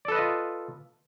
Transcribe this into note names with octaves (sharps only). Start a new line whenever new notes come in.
F4 A4 B4 D5 D#5